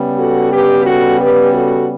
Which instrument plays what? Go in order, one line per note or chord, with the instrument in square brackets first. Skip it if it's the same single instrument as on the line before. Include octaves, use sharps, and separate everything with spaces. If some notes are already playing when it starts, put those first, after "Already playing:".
Already playing: [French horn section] C#3 G3 B3
F#4 A4
G4 B4
F#4 A4
G4 B4
F#4 A4